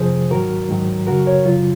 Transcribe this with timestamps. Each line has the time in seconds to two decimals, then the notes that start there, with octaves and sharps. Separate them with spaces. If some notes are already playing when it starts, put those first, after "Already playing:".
Already playing: F2 C3 F3 G#4 C5
0.30 G#2 D#3 F#3 F#4 A#4
0.69 G#2 D#3 F#3
1.07 F#2 C#3 F#3 F#4 A#4
1.26 A#4 C#5
1.45 F#2 C#3 F#3 F4